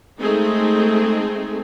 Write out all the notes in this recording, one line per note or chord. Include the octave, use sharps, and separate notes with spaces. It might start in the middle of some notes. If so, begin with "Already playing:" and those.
G#3 A3 C4 D#4 G#4